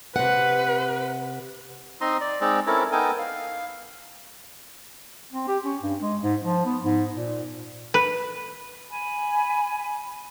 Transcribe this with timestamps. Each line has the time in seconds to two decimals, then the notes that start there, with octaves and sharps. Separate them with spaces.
0.16 C3 B4 F#5
2.01 C4 D#4 A#5 C6 D#6
2.21 D5
2.41 G#3 C4 D#4 D5
2.67 C4 C#4 E4 A4 A#4
2.92 B3 D#4 A4 A#4 G5 G#5
3.18 F5
5.32 C4
5.48 G4
5.64 C#4
5.82 G2
6.00 G#3
6.22 G#2
6.43 F3
6.65 B3
6.84 G#2
7.15 A#2
7.94 B4
8.90 G#5 B5